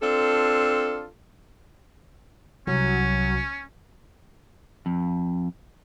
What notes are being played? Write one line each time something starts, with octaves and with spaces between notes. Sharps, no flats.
C4 D4 F4 A4
C2 F#3 C#4
F2